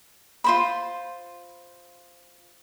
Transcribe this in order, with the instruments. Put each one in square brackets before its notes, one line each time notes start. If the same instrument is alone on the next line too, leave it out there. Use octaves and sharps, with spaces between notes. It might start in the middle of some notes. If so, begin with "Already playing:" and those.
[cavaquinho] F4 C5 B5